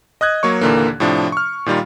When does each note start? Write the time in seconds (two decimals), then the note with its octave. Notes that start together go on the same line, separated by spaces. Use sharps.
0.21 D#5 D#6 F#6 G#6
0.43 F#3 A#3 C#5 C#6
0.61 D#2 A#2 D3 E3 A#3
1.00 A2 C3 F3 D4
1.32 C#6 F6
1.66 A#2 D#3 G3 F4